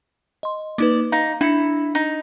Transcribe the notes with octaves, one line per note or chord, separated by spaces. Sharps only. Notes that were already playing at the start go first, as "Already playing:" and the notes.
D#5 C6
A#3 D#4 B4 D5
D#4 F5
D4 E4 C#7
D#4